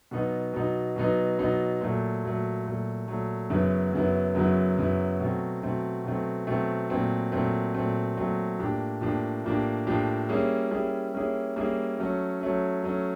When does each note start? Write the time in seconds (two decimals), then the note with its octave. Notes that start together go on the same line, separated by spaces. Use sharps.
0.11 B2 F#3 B3 D#4
0.53 B2 F#3 B3 D#4
0.96 B2 F#3 B3 D#4
1.39 B2 F#3 B3 D#4
1.81 A#2 F#3 A3
2.23 A#2 F#3 A3
2.65 A#2 F#3 A3
3.07 A#2 F#3 A3
3.50 F#2 C#3 F#3 B3 E4
3.93 F#2 C#3 F#3 B3 E4
4.35 F#2 C#3 F#3 B3 E4
4.78 F#2 C#3 F#3 B3 E4
5.20 B2 F#3 A3 C4
5.62 B2 F#3 A3 C4
6.05 B2 F#3 A3 C4
6.47 B2 F#3 A3 C4
6.90 A#2 F#3 A3 C4
7.32 A#2 F#3 A3 C4
7.74 A#2 F#3 A3 C4
8.17 A#2 F#3 A3 C4
8.59 A2 F3 A#3 D4 G4
9.01 A2 F3 A#3 D4 G4
9.44 A2 F3 A#3 D4 G4
9.87 A2 F3 A#3 D4 G4
10.29 G3 A#3 C#4 E4 G#4
10.71 G3 A#3 C#4 E4 G#4
11.14 G3 A#3 C#4 E4 G#4
11.56 G3 A#3 C#4 E4 G#4
11.98 F#3 A3 C#4
12.41 F#3 A3 C#4
12.83 F#3 A3 C#4